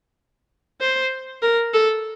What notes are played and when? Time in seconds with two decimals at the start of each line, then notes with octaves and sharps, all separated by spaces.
0.81 C5
1.42 A#4
1.74 A4